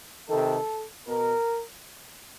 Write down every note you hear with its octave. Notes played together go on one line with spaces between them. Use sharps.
C3 D#3 A4
B2 A#4